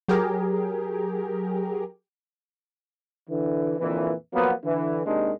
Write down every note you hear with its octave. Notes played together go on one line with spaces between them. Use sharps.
F#3 G4 G#4 A#4
D3 E3
F2 A#2 D3 E3
F3 F#3 A#3 B3
D3 E3
G#1 D#2 C3 D#3 G#3 D4